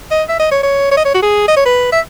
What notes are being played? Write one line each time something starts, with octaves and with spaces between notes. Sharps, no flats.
D#5
E5
D#5
C#5
C#5
C#5
D#5
C#5
F#4
G#4
D#5
C#5
B4
E5